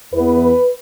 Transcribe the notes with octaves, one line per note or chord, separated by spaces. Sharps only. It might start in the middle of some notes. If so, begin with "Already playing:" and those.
E2 E3 B3 B4